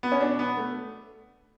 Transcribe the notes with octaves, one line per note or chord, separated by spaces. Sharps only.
B3
C#4
B2 D4
B3
A3